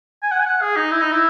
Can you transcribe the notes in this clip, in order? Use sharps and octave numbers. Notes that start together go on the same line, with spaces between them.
G#5
F#5
G#5
F#5
G#4
D#4
E4
D#4
E4